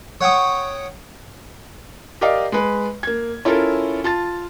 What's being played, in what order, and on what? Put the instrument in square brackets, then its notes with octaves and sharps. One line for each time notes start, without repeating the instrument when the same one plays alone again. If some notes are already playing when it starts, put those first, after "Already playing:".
[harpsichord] C#5 F#5 G5 C#6 D#6
[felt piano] G4 A#4 D5 D#5 F5
G#3 B4
A#3 G#6
C#4 E4 F4 A4 A#4
F4 A5 A6